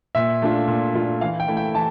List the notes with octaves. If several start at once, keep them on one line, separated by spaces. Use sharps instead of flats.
A#2 E5
A3 D4 F4
A#2
A3 D4 F4
E3 F5
G5
A3 E4
G5
E3 A5